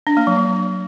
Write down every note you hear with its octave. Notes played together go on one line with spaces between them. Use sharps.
D4
A#3
F#3
F#3